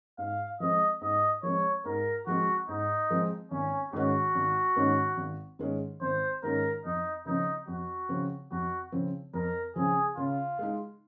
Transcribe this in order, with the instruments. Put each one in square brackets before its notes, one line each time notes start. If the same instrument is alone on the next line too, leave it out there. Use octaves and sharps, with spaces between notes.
[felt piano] G#2 [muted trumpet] F5
[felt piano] F3 G#3 C4 [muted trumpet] D#5
[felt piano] G#2 [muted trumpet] D#5
[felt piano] F3 G#3 C4 [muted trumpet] C#5
[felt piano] G#2 [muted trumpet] A#4
[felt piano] F3 G#3 C4 [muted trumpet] F#4
[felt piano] G#2 [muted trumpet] D#4
[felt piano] F3 G#3 C4
[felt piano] G#1 [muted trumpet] C#4
[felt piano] G#2 D#3 G#3 C#4 [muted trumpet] F#4
[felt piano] G#1
G#2 D#3 G#3 C#4
G#1
G#2 D#3 G#3 C#4
[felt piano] G#1 [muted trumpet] C5
[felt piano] G#2 D#3 G#3 C#4 [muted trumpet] A#4
[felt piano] F2 [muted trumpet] D#4
[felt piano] C#3 F3 C4 [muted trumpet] D#4
[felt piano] F2 [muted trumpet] F#4
[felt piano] C#3 F3 C4
[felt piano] F2 [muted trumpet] F#4
[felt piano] C#3 F3 C4
[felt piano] F2 [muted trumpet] A#4
[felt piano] C#3 F3 C4 [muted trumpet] G#4
[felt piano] C#3 [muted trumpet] F4
[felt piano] G#3 D#4